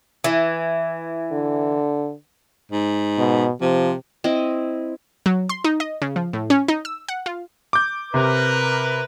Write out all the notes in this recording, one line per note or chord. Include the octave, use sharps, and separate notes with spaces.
E3
D3
G#2
B2
C3 F3
C4 E4 D#5
F#3
C6
D#4
D#5
C#3
F3
A2
C#4
D#4
E6
F#5
F4
D6 G6
C3 A#4 B4